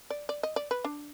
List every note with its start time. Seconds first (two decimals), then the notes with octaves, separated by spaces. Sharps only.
0.10 D5
0.29 D5
0.43 D#5
0.56 D5
0.71 B4
0.85 D4